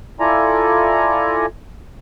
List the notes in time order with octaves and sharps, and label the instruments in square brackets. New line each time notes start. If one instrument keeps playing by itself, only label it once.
[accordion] E4 F4 A4 D5 G#5 A#5